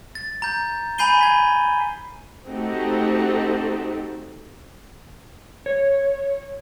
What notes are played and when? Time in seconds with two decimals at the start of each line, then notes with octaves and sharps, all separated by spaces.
0.15 A6
0.42 A#5 G6
0.98 G#5 B5 G6 C7 D#7 G7
1.21 G#6 B6
2.46 A3 C4 D#4 F#4 G4 A4
5.66 C#5